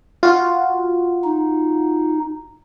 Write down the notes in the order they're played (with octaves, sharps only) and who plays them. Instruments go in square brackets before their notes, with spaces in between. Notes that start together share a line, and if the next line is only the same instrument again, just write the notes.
[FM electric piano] F4 F#4
[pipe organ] D#4